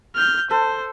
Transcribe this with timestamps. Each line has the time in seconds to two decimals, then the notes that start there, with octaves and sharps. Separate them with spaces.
0.15 F6 G6
0.51 A4 C5